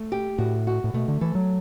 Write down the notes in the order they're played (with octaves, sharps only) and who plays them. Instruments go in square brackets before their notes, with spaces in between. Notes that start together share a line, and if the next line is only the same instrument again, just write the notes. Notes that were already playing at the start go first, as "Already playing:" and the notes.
Already playing: [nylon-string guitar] A3
G4
[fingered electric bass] A2 [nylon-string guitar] F#4
[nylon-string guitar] F#4
[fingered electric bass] A2
[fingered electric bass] B2 [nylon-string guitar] A3
[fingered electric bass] D3
[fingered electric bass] E3 [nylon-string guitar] A4
[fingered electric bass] F#3